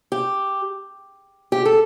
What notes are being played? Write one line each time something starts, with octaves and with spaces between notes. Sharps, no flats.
G4
G4
A4